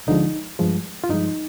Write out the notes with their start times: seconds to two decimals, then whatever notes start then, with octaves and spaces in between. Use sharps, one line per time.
0.07 D2 D3 F3 G#3 D#4
0.59 G2 F3 G#3
1.04 F4
1.10 G2 F3 G#3 D#4